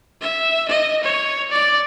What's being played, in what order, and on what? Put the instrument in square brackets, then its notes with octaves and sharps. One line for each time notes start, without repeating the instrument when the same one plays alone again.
[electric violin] E5
D#5
C#5
D5